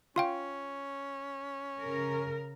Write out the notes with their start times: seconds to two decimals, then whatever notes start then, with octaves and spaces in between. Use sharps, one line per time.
0.16 C#4 F4 F5 G5
1.81 C#3 A#4